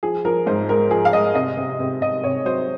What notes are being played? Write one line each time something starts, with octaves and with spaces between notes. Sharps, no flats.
F3 G#4
F3 A#4
G#2 C5
G#3 A#4
F3 G#4
F5
G#3 D#5
C3 D#5
C3
C3
C3 D#5
C3 C#5
F#3 C5